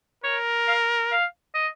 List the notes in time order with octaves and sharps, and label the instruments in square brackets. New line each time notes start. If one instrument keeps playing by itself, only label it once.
[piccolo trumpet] A#4 [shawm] C#5
[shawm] F5
F5
D#5